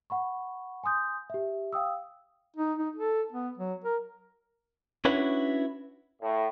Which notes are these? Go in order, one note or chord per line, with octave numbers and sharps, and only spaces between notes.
F#5 B5 C#6
G#5 C6 D#6 G6
G4 E5
F5 G5 D#6 E6
D#4
D#4
A4
B3
F#3
A#4
C#4 D4 E4 F#4 B4 C#5
A2